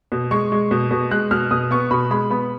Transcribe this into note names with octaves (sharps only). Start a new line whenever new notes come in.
B2
G#3 C#6
G#3
B2
B2
G#3 F#6
B2 F6
B2 D#6
B3 C#6
B2 B5
G#3 B5
B3 B5